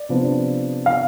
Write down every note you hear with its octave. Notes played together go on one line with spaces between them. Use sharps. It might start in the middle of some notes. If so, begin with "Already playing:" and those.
Already playing: D5
C3 F3 B3 D4
F5